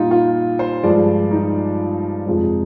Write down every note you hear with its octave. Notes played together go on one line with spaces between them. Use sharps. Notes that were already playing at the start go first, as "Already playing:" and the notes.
Already playing: A#2 G3 D#4 F4
F4
C5
G2 F3 G#3 D5
D#4
F2 C3 F3 G#3